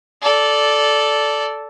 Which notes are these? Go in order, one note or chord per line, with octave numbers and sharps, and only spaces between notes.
A4 D5